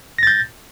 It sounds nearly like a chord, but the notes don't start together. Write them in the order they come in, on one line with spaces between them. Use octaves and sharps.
A#6 A6 G6